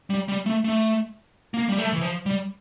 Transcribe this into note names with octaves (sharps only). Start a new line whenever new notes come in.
G3
G3
A3
A3
A#3
G3
A3
E3
F3
G3